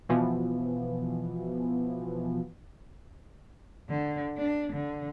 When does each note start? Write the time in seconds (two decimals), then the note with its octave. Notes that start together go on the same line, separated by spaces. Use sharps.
0.09 B2 E3 F3 B3
3.89 D3
4.37 D4
4.73 D3